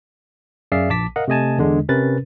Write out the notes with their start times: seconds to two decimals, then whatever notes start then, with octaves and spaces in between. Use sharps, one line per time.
0.72 F#2 G#4 D5 E5 F5 C7
0.90 A#1 A5 D6 B6
1.16 A#4 D#5 F5 F#5
1.28 C3 A3 D#5 G#5 A5
1.58 E2 D3 G#3 D4
1.88 C3 C#4 A#4 B4 A6